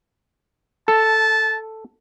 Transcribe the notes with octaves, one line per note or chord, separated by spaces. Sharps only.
A4 A5